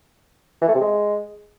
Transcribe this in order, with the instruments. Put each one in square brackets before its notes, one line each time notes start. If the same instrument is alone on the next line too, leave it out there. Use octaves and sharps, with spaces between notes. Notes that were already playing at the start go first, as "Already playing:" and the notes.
[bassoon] E3
A3
C3
G#3